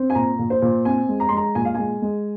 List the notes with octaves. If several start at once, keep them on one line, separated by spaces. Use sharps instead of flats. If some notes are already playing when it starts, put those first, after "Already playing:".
Already playing: C4
G#5
A#2 A#5
A#2
C5
A#2
C4 G#5
G#3
A#5
G#3 C6
A#5
A#2 G#5
F5
G#3 G#5
G#3